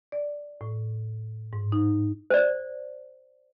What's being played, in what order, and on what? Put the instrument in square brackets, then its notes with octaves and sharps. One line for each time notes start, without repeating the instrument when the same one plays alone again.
[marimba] D5
A2
G#2
D#4
[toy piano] C5 D5